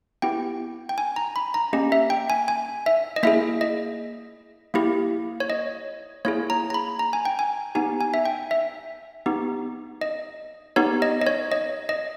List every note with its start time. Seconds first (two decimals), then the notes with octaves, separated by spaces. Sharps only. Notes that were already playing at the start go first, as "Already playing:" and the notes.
0.22 B3 E4 G4 G5
0.89 G5
0.98 G#5
1.16 A#5
1.36 B5
1.54 A#5
1.73 A#3 C#4 G4 D#5
1.92 E5
2.10 G5
2.30 G#5
2.48 G#5
2.86 E5
3.16 D#5
3.23 A#3 E4 G#4 E5
3.61 D#5
4.74 A#3 E4 G4
5.40 C#5
5.50 D#5
6.25 A#3 E4 G#4 C#5
6.50 A#5
6.70 A#5
6.74 B5
6.99 A#5
7.13 G#5
7.25 G5
7.39 G#5
7.75 B3 D#4 G4 G#5
8.01 G#5
8.14 E5
8.25 G5
8.51 E5
9.26 B3 D#4 G4
10.01 D#5
10.76 B3 D#4 G4 C#5
11.02 D#5
11.21 D#5
11.27 C#5
11.52 D#5
11.89 D#5